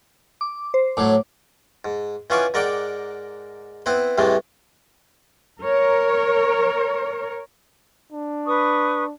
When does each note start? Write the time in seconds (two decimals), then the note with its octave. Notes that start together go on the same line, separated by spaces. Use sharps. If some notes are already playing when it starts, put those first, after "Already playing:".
0.41 D6
0.74 C5
0.97 A2 F#3 D6
1.85 G#2
2.30 E3 C#4 F4 F#5 G#5 D6
2.54 G#2 A#4 D5 F#5 G5 D6
3.86 B3 C4 E4 B4
4.18 C2 A2 C3 E3 G#3 A3
5.61 A#4 C#5
8.12 D4
8.46 B4 C#6 D#6